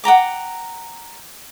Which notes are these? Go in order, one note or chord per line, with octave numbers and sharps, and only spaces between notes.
F#5 G5 A#5 D6